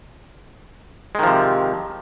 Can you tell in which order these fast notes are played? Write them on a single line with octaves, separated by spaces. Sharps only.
G#3 D#3 F3 C3